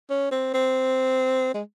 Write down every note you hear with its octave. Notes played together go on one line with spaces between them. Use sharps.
C#4
C4
C4
G#3